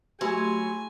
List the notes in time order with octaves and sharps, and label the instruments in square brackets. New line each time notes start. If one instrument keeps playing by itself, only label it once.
[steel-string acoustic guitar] F#3 [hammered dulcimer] G#3 A3 E4 [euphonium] G4 [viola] G#5